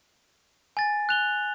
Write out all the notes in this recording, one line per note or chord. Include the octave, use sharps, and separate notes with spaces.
G#5 A6
F#6 F7 G7